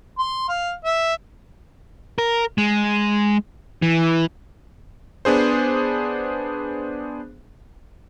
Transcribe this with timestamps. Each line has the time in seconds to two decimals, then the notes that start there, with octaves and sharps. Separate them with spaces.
0.19 C6
0.49 F5
0.85 E5
2.18 A#4
2.58 G#3
3.82 E3
5.25 B3 D4 G#4 C5